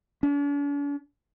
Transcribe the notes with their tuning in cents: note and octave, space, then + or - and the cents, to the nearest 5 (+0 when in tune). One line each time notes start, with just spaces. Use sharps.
D4 -45